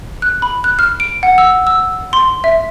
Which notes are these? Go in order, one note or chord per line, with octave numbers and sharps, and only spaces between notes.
F#6
B5
F#6
F6
D7
F#5
E6
E6
C6
E5